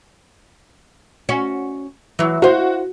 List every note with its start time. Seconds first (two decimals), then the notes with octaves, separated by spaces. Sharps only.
1.29 C#4 F#4
2.19 E3 F#3
2.42 F#4 C5 F5